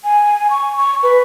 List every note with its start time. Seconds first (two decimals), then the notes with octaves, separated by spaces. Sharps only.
0.04 G#5
0.50 C#6
0.78 C#6
1.03 B4